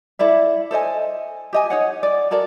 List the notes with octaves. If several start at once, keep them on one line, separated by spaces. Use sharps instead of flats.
E4 A4 D5 E5
A4 C5 D#5 G#5
G4 D#5 G#5
D#4 C#5 F#5
D5
F#4 A4 A#4 D5